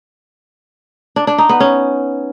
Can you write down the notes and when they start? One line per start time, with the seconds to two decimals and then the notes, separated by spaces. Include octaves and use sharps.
1.16 D4
1.27 D4
1.38 D#4
1.49 B3
1.60 C#4